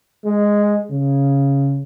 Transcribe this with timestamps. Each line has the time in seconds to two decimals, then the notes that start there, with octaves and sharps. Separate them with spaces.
0.25 G#3
0.90 C#3